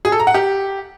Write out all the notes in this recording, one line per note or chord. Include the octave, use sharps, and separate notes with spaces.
G#4
A4
A#5
F#5
G4